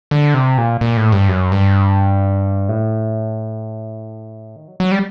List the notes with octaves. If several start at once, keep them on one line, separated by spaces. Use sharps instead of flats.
D3
C3
A#2
A#2
A2
G2
F#2
G2
A2
D#3
F#3
F#3
G3